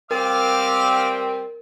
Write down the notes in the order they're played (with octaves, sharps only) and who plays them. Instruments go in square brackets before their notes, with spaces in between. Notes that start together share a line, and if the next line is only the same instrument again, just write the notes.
[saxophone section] G3 C4 [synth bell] A#4 [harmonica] F5 D6 F6